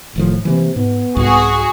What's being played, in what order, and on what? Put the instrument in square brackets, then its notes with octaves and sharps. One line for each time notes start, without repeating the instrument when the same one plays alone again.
[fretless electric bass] F1 D#3 F3 [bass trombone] A2
[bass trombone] C3 [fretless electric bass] E3 F#3 A#3
[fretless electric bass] G#2 [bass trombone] B3
[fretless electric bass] C2 G#2 [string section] F#4 G#4